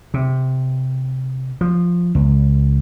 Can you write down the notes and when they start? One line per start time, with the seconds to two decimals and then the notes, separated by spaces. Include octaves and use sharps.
0.14 C3
1.61 F3
2.15 C#2